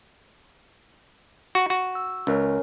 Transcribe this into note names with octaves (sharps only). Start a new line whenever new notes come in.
F#4
F#4
E6
C#2 C#4 A#4 C#5